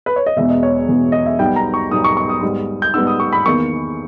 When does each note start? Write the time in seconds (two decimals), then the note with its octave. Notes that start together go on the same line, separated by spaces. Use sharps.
0.06 B4
0.16 C#5
0.26 D#5
0.36 E1 E2 B2 E5
0.50 D#5
0.63 C#5
0.88 E1 E2 B2
1.12 D#5
1.26 E5
1.39 B1 B2 G3 B3 D#4 G5
1.56 A#5
1.74 C#6
1.91 B1 B2 G3 B3 D#4 D#6
2.04 C#6
2.17 C#6
2.29 D#6
2.42 G#2 G3 B3 D#4
2.82 G6
2.94 G#2 G3 B3 D#4 E6
3.07 D#6
3.20 C#6
3.33 B5
3.46 E2 D#3 A#3 C#6